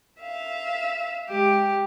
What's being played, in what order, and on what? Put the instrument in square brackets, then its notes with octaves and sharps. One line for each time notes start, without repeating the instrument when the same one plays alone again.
[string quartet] E5 F5
[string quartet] G#3 [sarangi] G4